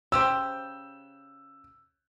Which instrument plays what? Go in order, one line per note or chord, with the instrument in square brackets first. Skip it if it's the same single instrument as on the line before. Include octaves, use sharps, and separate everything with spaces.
[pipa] C#3 G4 C5 [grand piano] E6